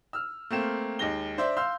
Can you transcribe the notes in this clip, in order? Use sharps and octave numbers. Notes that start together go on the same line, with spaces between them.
E6 F6
A3 A#3 C4 E7
D#2 G#3 A#6 G7
D4 C5 D5 E5
F5 C6 E6 G6